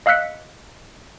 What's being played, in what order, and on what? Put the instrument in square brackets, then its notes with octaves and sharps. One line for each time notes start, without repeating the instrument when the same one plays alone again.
[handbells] D#5 F5 E6 F#6 B6 C#7